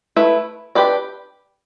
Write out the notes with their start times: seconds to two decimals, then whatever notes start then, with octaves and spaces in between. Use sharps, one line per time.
0.16 A3 E4 B4
0.75 D4 G4 B4 D5